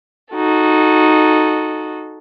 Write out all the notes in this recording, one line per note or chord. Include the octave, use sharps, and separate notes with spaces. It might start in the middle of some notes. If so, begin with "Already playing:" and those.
D#4 F#4 A4